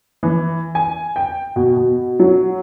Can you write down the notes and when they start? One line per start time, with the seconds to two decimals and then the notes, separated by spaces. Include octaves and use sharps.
0.23 E3
0.75 G#5
1.16 G5
1.56 B2
1.76 B2
2.19 F#3